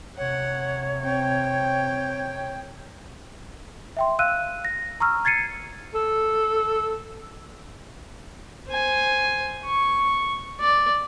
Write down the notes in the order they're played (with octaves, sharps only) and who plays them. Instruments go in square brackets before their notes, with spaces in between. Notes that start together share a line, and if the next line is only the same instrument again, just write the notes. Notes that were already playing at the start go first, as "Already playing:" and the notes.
[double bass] C3 [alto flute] C#5 [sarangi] F#5
[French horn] C4 [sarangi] G5
[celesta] E5 G5 C6
F5 E6 F#6 D#7
A#6
A#5 C#6 E6 F6
G#6 A6 C7 C#7 D#7
[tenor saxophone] A4
[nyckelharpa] C5 G#5
C#6
D5